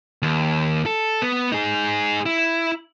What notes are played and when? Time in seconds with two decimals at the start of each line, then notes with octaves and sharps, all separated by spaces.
0.22 D#2
0.86 A4
1.22 B3
1.52 D#4 G#4
2.26 E4